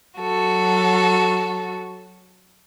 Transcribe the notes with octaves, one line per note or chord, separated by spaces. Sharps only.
F#3 F#4 A4